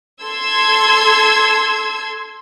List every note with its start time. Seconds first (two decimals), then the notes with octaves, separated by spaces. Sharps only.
0.23 A4 C6 E6 G#6